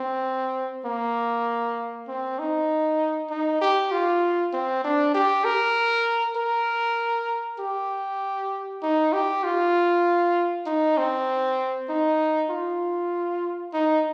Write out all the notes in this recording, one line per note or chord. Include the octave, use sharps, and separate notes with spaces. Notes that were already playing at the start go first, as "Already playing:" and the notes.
Already playing: C4
A#3
C4
D#4
D#4
G4
F4
C4
D4
G4
A#4
A#4
G4
D#4
G4
F4
D#4
C4
D#4
F4
D#4